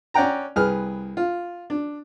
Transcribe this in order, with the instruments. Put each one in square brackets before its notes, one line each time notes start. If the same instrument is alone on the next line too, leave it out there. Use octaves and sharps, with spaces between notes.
[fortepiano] C#4 D5 F#5 G5 A#5
C2 G#4 B4 F6
F4
D4